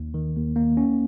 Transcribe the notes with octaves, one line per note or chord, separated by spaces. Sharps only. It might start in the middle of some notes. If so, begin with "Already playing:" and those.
Already playing: D#2
D#3
D#2
A#3
C#4